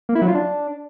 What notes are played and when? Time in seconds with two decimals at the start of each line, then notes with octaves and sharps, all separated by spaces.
0.09 A#3
0.15 E4
0.22 F#3
0.28 F4
0.35 D4